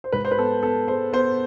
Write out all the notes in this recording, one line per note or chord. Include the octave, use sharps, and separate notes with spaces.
C5
G#2 B4
C5
B4
B3 A4
B3 A4
G#3 C5
B3 C5